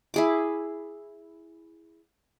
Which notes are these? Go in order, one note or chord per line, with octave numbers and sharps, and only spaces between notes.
E4 G#4 D6